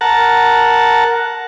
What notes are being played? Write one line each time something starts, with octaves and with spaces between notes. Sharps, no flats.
A#4 F#5 A5